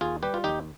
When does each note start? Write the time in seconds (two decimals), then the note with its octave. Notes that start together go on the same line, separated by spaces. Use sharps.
0.01 D#2 F4 G#4
0.23 G3 G4 B4
0.34 F4
0.44 D#2 D#4 G4